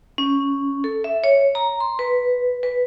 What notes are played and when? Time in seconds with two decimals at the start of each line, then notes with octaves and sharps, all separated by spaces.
0.18 C#4
0.84 A4
1.04 E5
1.24 C#5
1.55 A#5
1.80 C6
1.99 B4
2.63 B4